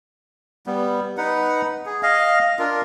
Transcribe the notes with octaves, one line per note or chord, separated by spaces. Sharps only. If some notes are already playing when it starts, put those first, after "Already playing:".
G3 B3
D#4 B4 F#5
G#4
D#5 F5
D4 F4 A#4